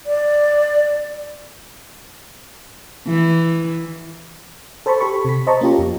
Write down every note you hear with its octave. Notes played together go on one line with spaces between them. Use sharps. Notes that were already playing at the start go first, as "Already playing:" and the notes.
D5
E3
A4 C5 A5 B5 C#6
G4 A4 B5 C#6
C3 B6
C5 D#5 A5 A#5 C#6
A#3 C#4 F4 G4
F2